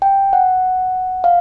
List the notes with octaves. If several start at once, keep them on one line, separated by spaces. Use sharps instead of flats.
G5
F#5
F5